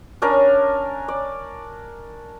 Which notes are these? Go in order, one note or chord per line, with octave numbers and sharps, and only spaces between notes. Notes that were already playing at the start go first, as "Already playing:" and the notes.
C#4 D4 A#4 G#5
D5